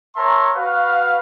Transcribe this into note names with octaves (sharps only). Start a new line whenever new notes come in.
A#4 C#5 E5 A5 A#5 C6
F#4 B4 F5